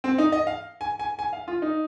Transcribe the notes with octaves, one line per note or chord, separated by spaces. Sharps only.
C4
D#4
D#5
F5
G#5
G#5
G#5
F5
F4
D#4